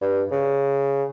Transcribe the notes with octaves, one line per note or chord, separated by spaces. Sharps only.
G2
C#3